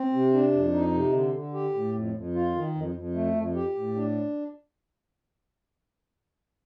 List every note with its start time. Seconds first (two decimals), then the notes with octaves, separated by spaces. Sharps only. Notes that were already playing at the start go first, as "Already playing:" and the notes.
Already playing: C4
0.13 C3
0.33 D4
0.53 F2
0.74 D#4
0.94 C3
1.13 D3
1.34 D3
1.54 G4
1.74 A2
1.94 F2
2.14 F2
2.35 F4
2.55 D#3
2.75 F2
2.95 F2
3.14 A3
3.36 F2
3.55 G4
3.75 A2
3.96 D4